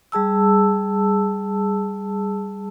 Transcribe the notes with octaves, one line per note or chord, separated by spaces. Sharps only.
G3 G#4 A5 E6